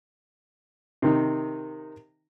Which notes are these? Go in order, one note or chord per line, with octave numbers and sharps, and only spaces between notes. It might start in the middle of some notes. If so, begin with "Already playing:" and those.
C3 D#3 D#4